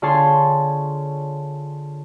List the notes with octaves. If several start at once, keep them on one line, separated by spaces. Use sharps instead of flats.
D3 F4 G#4 C#5 A5 C6